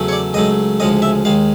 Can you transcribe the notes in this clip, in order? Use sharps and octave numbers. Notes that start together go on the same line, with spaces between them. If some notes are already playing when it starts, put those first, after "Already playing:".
Already playing: E2 C#3 F#3 A3
C#5
D5
C#2 C#3 F#3 A3 D#5
D2 C#3 F3 G#3 D#5
E5
D#2 D#3 G#3 F5